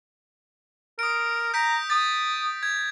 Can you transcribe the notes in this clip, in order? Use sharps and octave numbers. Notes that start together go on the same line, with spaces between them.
A#4 D#6 D7
A#5 G6 B6 D7
D#6 A6
G#6